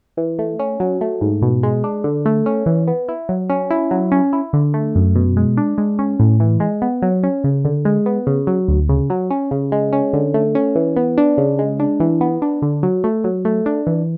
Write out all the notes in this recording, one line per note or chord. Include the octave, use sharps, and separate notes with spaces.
E3
A3
C#4
F#3
A3
G#2
B2
G#3
D4
D3
A3
C#4
E3
B3
E4
F#3
C#4
E4
F#3
C#4
E4
D3
A3
F#2
B2
G#3
D4
G#3
C#4
A2
E3
G#3
B3
F#3
C#4
C#3
D3
G#3
B3
C#3
F#3
D2
C#3
F#3
C#4
C#3
G#3
C#4
D3
A3
C#4
E3
B3
D4
C#3
G#3
D4
E3
B3
D4
D3
F#3
A3
F#3
A3
D4
E3